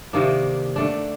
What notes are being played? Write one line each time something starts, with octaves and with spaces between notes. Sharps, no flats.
C3 D#3 A#3 D4
D3 A3 D4